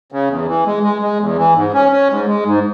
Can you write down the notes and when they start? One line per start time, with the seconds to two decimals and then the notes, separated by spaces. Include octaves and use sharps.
0.12 C#3
0.30 E2
0.48 E3
0.66 G#3
0.83 G#3
1.02 G#3
1.20 E2
1.37 E3
1.55 G#2
1.73 C#4
1.92 C#4
2.10 G#2
2.28 G#3
2.45 G#2